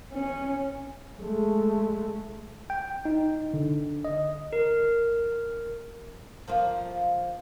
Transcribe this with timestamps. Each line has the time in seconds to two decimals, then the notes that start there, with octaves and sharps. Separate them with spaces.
0.12 C#4
1.21 G#3 A3
2.70 G5
3.05 D#4
3.54 D3
4.05 D#5
4.53 A#4
6.48 F3 A#3 F4